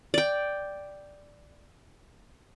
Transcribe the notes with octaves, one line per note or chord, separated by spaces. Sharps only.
D5 G5